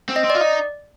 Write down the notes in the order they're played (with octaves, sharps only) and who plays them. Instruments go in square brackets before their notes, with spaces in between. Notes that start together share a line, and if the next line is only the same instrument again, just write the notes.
[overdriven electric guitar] C4
[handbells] D#5
[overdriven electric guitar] C4
[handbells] D5
[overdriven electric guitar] F4
D#4